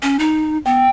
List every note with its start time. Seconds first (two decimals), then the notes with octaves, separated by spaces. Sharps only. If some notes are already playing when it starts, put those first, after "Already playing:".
0.03 C#4
0.19 D#4
0.66 B3 G5